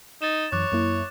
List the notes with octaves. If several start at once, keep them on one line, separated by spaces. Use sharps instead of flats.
D#4 A6 E7
F#2 E3 C#5 D6 F#6 A6
F#2 A#3 E4